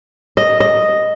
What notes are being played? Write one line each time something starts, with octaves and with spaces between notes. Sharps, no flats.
D#5
D#5